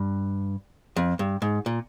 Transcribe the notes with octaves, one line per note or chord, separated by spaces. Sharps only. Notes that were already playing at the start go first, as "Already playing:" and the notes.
Already playing: G2
F2
G2
G#2
A#2